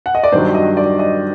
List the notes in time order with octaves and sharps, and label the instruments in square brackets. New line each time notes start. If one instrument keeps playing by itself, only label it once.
[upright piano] F#5
D#5
D5
G2 D#3 F#3 C5
D#5
D5
D#5